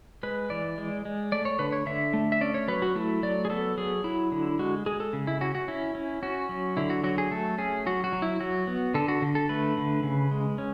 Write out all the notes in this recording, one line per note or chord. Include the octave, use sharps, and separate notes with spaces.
G#3 B4
E3 D5
G#3
G#3
A3 D5
C#5
D3 B4
C#5
D3 E5
A3
E5
C#4 D5
C#5
F#3 B4
F#4
A3 E4
F#3 D5
G#4
B3 A4
F#3 G#4
F#3 E4
D3
G#3 F#4
G#3 G#4
A4
C#3
E4
C#4 F#4
F#4
C#4 E4
C#4
C#4 F#4
F#3
D3 E4
F#4
F#3 F#4
G#4
A3 A4
C#4 G#4
F#3 F#4
F#4
F#3
E4
F#3 F#4
B3
D3 A4
F#4
D3
A4
A3 B4
D3
C#3
G#3
C#4